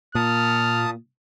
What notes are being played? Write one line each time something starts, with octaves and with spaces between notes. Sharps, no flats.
A#2 A5 D#6 F6